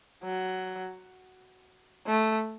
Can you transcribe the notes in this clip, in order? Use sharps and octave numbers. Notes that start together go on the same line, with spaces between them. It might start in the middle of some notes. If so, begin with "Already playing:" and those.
F#3
A3